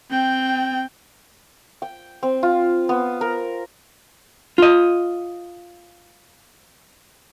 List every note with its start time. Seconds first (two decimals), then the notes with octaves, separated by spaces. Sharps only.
0.11 C4 G5
1.82 G5
2.23 C4
2.43 F4
2.89 B3
3.21 A#4
4.58 F4 D#5